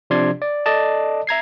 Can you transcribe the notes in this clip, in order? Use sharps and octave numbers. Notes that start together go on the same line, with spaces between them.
C3 F3 D4 D5 C6 G#6
D5
A4 D5 D#5 A5
E5 A#5 G#6 C7